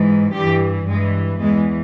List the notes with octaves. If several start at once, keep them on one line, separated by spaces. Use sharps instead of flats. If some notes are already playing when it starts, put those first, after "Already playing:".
Already playing: G#2 E3
G2 E3 G4
G2 E3 G#3
E2 E3 G#3